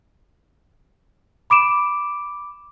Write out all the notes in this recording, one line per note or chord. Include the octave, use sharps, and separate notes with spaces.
B5 D6 D7 E7